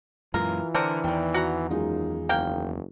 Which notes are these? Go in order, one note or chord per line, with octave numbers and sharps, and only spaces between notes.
F#2 A#2 E3 G#3 F4 A#4
D3 C4 D4 A#4 C#7
E2 D#3 D5 G5
F#4 F#5 A#5
F#2 G#3 D#4 F4
F#1 A#3 A#4 G5